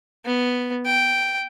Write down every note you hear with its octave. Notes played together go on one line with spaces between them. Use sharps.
B3
G5